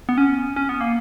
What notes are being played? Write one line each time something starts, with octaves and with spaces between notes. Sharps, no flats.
B3
C#4
C#4
B3
A#3